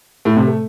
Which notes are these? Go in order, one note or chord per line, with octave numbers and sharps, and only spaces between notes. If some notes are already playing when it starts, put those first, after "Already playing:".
A2
C3
A3